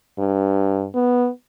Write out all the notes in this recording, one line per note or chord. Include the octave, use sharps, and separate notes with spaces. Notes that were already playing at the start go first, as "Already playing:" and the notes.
G2
B3